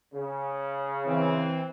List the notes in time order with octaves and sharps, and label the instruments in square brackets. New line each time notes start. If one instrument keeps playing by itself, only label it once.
[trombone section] C#3
[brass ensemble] E3 C4